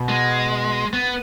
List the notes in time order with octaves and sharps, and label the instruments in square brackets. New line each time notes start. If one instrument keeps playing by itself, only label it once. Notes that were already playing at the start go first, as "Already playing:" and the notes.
Already playing: [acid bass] B2
[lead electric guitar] G#3
B3